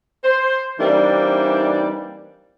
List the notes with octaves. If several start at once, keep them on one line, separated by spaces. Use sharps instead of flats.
C5
E3 G3 A#3 C4 D4 D#4